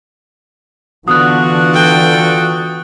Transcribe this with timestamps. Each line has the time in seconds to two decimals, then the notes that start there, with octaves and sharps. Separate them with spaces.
1.08 D3 E3 B3 D4 F4 F#4 D#6 F#6
1.72 A4 G5